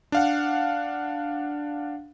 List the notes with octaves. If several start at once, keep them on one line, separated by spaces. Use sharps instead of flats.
D4 F5 F#5